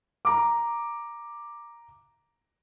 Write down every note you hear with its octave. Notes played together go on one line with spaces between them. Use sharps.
A#5 D6